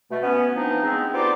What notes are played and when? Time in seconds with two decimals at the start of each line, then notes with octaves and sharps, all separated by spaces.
0.10 B2 A3
0.23 B3 C#4
0.55 E3 F3 C4 D4 D#4
0.84 G#3 B3 C4
1.14 B3 C4 D#4 F4 G4 D5